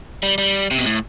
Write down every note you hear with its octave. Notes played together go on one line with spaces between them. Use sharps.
G3
G3
C3
B2
A2